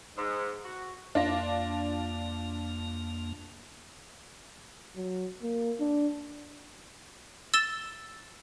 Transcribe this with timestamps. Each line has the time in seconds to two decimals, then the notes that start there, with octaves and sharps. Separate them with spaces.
0.17 G#2
0.65 F#4
1.15 F2 A#3 D4 F4 A#6
4.96 F#3
5.43 A#3
5.80 D4
7.54 E6 A6 E7 G7